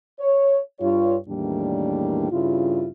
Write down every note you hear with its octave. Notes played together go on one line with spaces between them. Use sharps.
C#5
G2 F4 C#5
E2 A2 D#3 G3 A#3 D4
G2 C#3 E4 F4